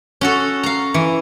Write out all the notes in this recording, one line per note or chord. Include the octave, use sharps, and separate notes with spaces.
C#4 F#4 A4
F5 A#5
E3